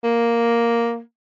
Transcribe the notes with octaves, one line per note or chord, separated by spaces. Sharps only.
A#3